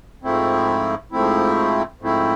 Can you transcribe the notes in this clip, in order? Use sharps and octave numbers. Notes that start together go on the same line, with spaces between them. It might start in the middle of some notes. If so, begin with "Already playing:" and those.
G#2 F3 A3 C4 E4
G#2 F3 A3 C4 E4
G#2 F3 A3 C4 E4